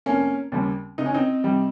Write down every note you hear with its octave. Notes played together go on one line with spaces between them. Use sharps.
F1 A#3 C#4
D#2 C#3 G3
C#2 D#4
C#4
C4 D#4
C3 G3